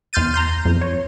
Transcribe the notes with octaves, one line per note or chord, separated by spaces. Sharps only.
E2 C6 F6 G6 A6 D#7
A#5 C6 G6
F2
C#5